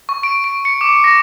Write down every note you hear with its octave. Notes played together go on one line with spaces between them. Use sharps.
C#6
D7
D7
C#7
D6
A#6